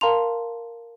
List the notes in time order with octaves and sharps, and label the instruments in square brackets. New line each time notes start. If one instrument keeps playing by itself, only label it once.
[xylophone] A#4 F5 A5 A#5 C6 F7